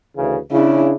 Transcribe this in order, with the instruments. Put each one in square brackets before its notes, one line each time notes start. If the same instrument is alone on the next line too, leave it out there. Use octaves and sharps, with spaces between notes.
[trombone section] D2 C#3 E3
[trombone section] C#3 [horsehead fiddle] D4 E4